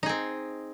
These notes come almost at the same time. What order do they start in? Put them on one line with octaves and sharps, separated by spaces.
D#4 G#4 C4